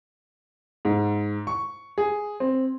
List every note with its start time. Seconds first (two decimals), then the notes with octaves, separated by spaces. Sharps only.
0.85 G#2
1.47 C#6
1.98 G#4
2.40 C4